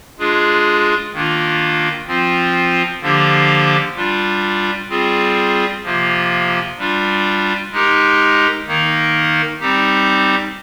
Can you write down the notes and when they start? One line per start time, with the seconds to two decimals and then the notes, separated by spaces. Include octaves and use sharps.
0.19 G#3 D4 F4 G#4
1.13 D#3 A#3 D4 F4
2.07 F3 C4 F4
3.01 D3 F3 A#3 D4 G4
3.96 G3 D4 F4
4.90 G3 C4 F4 G#4
5.84 C3 F3 A#3 F4
6.78 G3 D4 F4
7.72 G#3 D#4 G4 A#4
8.66 D#3 A#3 D#4 A#4
9.60 G3 C4 D#4 G4